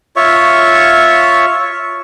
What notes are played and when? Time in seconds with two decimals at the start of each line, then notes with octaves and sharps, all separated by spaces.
0.16 F4 C#5 E5 C#6